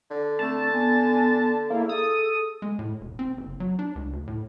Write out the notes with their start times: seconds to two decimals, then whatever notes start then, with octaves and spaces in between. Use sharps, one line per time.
0.11 D3
0.39 A3 C4 A5
0.72 B3 G#5
1.70 A#3 E4 G#4
1.89 A4 D#6
2.62 G#3
2.79 A2
3.01 E1
3.19 C4
3.37 F#1
3.60 F#3
3.79 D4
3.96 C#2
4.13 D2
4.27 A2